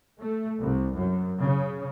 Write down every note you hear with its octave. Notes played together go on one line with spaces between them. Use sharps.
A3
C2
F#2
C#3